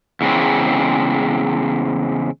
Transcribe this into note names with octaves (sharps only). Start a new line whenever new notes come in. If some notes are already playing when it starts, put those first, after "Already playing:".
E2 C#3 G#3 C4